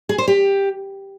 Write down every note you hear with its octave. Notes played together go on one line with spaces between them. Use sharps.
G#4
C5
G4